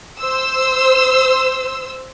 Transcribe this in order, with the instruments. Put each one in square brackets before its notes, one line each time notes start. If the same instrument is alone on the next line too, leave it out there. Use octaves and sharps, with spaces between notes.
[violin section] C5 E6